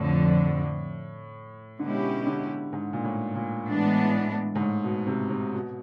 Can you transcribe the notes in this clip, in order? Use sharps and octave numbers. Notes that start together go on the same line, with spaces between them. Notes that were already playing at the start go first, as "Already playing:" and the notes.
Already playing: F2 A2 D3 F3
B2 D3 G#3 C#4 E4 G4
D3
G#2
A#2
A2
A#2
A2 E3 G#3 B3 D4
G#2
A2
B2
C3
C3
B2